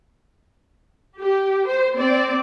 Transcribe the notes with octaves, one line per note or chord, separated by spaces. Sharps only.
G4
C5
C4 D5